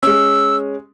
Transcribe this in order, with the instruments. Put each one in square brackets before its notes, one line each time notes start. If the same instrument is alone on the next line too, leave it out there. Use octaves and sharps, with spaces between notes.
[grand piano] G#3 C#4 [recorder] E6